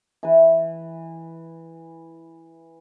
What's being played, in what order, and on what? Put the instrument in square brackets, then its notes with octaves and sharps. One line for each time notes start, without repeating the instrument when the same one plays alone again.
[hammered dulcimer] E3 B4